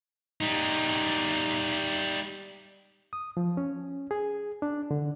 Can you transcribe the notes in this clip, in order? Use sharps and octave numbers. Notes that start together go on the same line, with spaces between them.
G3 D#4
D#6
F3
C#4
G#4
D4
D3